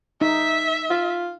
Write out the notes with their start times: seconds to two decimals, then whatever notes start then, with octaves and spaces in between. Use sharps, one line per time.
0.21 D#4 E5
0.90 F4